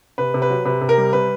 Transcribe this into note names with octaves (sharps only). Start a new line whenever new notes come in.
C3 B4
C3
B4
F#3
C3 B4
C3
A#4
G3
C3 B4